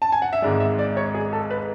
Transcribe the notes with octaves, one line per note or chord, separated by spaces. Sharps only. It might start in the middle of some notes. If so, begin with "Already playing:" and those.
A5
G#5
F#5
E5
G#1 G#2 G#3 D5
E5
D5
C#5
G#4
A4
B4